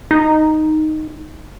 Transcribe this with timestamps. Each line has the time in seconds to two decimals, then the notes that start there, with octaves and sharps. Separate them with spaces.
0.11 D#4